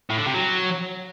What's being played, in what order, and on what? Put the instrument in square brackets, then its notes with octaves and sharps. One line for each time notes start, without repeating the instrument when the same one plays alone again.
[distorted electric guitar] A2
D3
C3
F#3